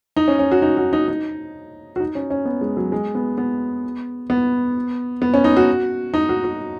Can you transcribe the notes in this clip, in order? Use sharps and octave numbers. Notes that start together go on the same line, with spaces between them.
D#4
C#4
C#4
F#4
D#4
F#4
D#4
D#4
F#4
D#4
C#4
C#4
B3
G#3
F#3
G#3
B3
B3
B3
B3
C#4
D#4
F#4
D#4
F#4
F#4